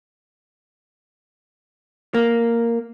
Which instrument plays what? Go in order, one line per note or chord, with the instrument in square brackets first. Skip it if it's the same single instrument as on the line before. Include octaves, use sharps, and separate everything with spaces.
[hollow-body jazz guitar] A#3